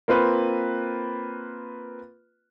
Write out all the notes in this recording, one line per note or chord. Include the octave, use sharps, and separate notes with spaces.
A#3 C4 F4 B4